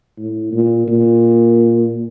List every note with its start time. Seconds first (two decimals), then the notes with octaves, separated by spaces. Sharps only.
0.18 A2
0.53 A#2
0.87 A#2